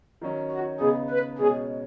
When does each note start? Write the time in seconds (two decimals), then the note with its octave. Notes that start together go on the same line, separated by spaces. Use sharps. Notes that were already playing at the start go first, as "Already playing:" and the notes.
0.21 D#3 F#3 C#4
0.51 F#4
0.80 C#3 B3 D#4 G#4
1.10 B4
1.39 B2 G#3 C#4 G#4